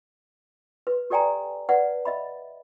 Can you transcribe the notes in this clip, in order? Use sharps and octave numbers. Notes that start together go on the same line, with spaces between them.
B4
G4 A4 D5 G5 G#5 A#5
B4 D5 F#5
D#5 E5 B5